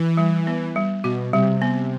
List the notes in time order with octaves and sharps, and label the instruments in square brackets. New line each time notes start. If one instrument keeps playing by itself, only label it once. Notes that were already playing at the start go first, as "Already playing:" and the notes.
Already playing: [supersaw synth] E3
[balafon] G3
B3
G3
[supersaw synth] B2 [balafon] F#4
[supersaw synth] C3 [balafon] G3
[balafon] B3